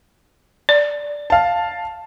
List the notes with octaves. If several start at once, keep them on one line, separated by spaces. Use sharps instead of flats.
D5
F5 A5